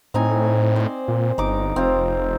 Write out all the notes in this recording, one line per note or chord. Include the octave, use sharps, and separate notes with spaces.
A2 C4 D#4 G#5
C5 D5
A#2
G1 D#4 D6
F1 C4 F4